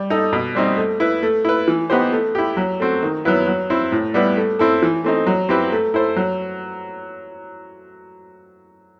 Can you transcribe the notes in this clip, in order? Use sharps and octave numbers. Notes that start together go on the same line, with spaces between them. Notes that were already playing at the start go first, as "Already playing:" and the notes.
Already playing: G3
D#4 A4
B2
G3 C4 D#4
A3
E4 B4
A3
E4 B4
E3
B3 D#4 G4 C5
A3
E4 G4
F#3
A3 C4 F#4
D#3
F#3 B3 E4 B4
F#3
C4 E4
A2
G3 B3 E4 B4
A3
C4 E4 A4
E3
A3 C4 D#4
F#3
C4 E4 G4 B4
A3
E4 A4 C5
F#3